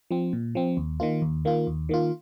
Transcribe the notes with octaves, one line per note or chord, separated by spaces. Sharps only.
F3 C4
A#2
F3 C4
D#2
D#3 A#3 F4
D#2
D#3 A#3 F4
D#2
D#3 A#3 F4